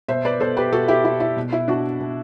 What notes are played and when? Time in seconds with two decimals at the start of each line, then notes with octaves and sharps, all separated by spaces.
0.08 B2 C5 E5
0.25 B4 D5
0.40 B2 A4 C5
0.57 G4 B4
0.72 B2 F#4 A4
0.88 E4 G4
1.04 B2 E4
1.20 E4
1.36 B2
1.53 E4
1.68 B2 D4 F#4
2.00 B2